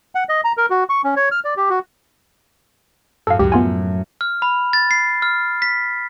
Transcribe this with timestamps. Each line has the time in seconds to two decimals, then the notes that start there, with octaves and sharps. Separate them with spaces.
0.15 F#5
0.29 D#5
0.44 A#5
0.57 A#4
0.70 F#4
0.90 C#6
1.04 C#4
1.16 C#5
1.32 F6
1.45 D5
1.57 G4
1.70 F#4
3.27 F#2 A2 A4 F5
3.39 C#2 F#2 F#3 G4
3.52 A3 B3 F4 G#5
4.21 F6
4.42 B5
4.73 A6
4.91 C7
5.22 F6
5.62 B6